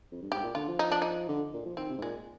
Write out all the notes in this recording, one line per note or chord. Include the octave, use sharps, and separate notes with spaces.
F2
G2
G#2 G4
A#2
D3 F4
F3
D#4
D4
D#4
D3
A#2
F3
D#3 C4
C3
G#2
A#2 G#3